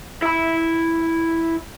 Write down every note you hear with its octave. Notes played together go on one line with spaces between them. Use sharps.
E4 B5